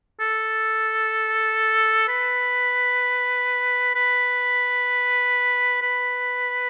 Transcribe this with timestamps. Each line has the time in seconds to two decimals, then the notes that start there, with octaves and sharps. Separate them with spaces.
0.20 A4
2.08 B4
3.95 B4
5.82 B4